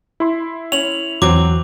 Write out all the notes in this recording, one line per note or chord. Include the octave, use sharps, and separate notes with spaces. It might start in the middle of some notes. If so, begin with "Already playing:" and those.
E4 C6
C#4 F7 F#7
E2 F#3 C4 D6